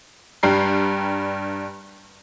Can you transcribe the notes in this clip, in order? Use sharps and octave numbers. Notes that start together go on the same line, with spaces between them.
G2 G3 G4 A#5 F#6 C7